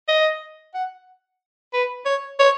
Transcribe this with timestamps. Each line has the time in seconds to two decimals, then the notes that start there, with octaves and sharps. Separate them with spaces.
0.08 D#5
0.74 F#5
1.74 B4
2.06 C#5
2.40 C#5